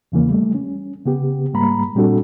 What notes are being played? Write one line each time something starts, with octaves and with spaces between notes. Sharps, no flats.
E2 C#3 E3 A#3
G3 A3
C#4
C#3 B3 G4
G#2 G3 A#3 A#5 B5
A#2 G3 C4 D4 F#4 A4